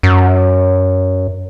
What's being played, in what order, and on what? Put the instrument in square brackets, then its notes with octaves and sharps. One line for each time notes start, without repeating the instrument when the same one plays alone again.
[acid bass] F#2